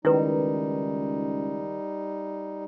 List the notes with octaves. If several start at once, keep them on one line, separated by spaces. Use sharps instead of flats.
C#2 D#3 G3 D#4 E4 B4